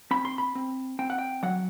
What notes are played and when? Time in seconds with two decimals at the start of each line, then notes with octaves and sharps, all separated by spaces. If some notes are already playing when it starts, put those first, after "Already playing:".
0.11 C4 B5
0.25 C6
0.38 B5
0.55 C4
0.99 C4 G5
1.10 F#5
1.19 G5
1.43 F#3 F#5